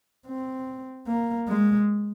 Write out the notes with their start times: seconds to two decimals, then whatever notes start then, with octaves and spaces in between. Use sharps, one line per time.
0.27 C4
1.07 A#3
1.48 G#3